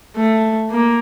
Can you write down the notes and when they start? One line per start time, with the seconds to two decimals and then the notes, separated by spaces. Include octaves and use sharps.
0.16 A3
0.71 A#3